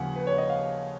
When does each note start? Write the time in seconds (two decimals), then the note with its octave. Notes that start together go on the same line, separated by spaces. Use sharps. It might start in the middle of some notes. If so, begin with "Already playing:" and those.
Already playing: D#2 C#3 F3 A#3 F#5 G#5
0.16 B4
0.27 C#5
0.38 D#5
0.50 F5